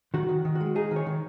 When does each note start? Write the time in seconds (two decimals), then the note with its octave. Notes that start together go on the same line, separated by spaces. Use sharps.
0.14 D#3 F#4
0.29 D#3
0.45 D#3
0.55 F#4
0.61 G#3
0.76 D#4 G#4
0.91 D#3
0.96 C#5
1.06 D#3